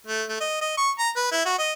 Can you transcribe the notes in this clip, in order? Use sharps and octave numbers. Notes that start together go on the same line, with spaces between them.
A3
A3
D#5
D#5
C#6
A#5
B4
E4
F#4
D#5